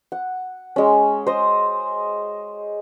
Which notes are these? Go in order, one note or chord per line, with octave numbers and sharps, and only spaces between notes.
F#5
G#3 C#4
C5 D#5